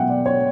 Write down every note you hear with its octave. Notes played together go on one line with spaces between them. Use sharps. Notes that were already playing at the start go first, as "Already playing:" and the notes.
Already playing: B2 F#3 E5 F#5 G5
D5
C#5